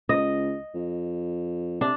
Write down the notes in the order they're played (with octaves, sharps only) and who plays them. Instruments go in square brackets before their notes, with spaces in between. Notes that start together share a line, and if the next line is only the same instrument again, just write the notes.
[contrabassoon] C#2 [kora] D#5
[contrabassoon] F2
[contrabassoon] C3 [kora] D4